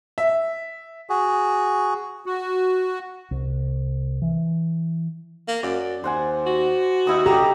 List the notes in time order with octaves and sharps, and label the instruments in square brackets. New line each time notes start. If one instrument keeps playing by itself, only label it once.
[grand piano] E5
[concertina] F#4 G#4
[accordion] F#4
[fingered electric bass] C2
E3
[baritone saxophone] A#3
[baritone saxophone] F#2 [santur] D5
[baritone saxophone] D#2 [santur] C5 F#5 G#5
[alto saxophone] F#4
[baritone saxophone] D#2 [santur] D#4 E4 D#6
[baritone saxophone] D3 [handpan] G4 [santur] A#5 D#6